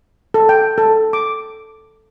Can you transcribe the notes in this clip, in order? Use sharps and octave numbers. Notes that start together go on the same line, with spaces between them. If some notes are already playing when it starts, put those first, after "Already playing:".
A4
G5
A4
D6